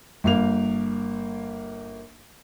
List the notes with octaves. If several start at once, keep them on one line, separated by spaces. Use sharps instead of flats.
G1 A#3 F7